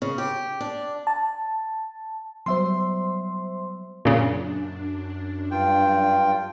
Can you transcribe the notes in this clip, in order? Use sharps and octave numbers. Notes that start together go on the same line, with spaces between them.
C#3
G4
D4
A5
F#3 G3 B3 C5 E5 C6
F#2 A#2 C#3 D4
G2 F4 G5